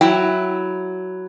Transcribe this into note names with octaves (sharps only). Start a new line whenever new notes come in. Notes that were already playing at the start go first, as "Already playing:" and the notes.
F#3 E4 G5